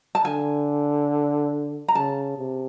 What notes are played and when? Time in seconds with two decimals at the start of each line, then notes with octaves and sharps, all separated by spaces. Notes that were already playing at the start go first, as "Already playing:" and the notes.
0.15 A5
0.25 D3 G#5
1.88 A#5
1.95 C#3 A5
2.38 C3